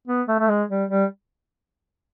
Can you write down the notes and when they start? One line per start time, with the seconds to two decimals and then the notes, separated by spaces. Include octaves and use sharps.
0.07 B3
0.28 A3
0.39 A3
0.49 G#3
0.70 G3
0.90 G3